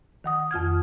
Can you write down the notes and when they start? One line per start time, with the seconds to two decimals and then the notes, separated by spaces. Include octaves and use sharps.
0.24 D#3 F#5 D#6
0.51 F2 F4 F6 G#6